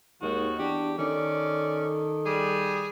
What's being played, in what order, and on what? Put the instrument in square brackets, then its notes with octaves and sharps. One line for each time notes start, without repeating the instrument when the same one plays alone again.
[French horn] D#2 [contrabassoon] G#2 [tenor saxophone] D#3 [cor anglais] F#4
[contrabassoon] E2 [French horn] D4 [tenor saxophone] G4
[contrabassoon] D#3 [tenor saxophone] C#4 [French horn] A4 [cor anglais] D5
[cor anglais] G3 [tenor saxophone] G#4